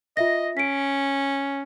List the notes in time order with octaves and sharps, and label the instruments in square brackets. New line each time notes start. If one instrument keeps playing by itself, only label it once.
[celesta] F4 E5 A#6 [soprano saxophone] D#5
[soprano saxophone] C#4 [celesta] B6 D7